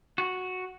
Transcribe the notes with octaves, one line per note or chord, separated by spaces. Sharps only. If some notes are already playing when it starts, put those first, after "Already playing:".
F#4